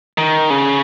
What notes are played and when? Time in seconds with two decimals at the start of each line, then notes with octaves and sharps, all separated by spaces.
0.18 D#3
0.50 C#3